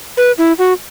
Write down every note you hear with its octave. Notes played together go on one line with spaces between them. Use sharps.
B4
E4
F#4